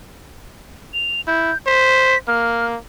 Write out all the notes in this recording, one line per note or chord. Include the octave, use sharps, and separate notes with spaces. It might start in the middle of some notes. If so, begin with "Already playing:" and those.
F7
E4 G6
C5 B6
A#3 F6